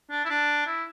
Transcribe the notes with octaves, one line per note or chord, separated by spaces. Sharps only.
D4
E4
D4
E4